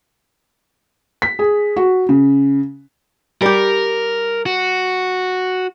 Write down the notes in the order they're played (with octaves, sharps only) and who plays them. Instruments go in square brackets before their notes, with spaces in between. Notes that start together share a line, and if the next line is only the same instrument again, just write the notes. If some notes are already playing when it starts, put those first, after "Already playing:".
[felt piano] B6
G#4
F#4
C#3
[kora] G3 G4 [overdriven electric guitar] A#4
[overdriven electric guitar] F#4